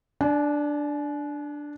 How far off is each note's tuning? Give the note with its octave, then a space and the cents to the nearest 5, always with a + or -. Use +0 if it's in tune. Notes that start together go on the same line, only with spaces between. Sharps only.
D4 +0 G#5 +45